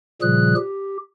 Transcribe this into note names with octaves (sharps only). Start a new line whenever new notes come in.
A#2 C#3 F3 G3 G#4 F#6
G4